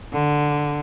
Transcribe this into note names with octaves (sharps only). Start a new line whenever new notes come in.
D3